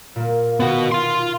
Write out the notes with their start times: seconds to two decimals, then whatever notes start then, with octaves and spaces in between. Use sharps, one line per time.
0.16 A#2 A#3
0.60 B2 D#3 B3 F#4
0.92 F5 C6